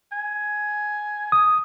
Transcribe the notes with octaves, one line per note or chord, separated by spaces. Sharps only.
G#5
D#6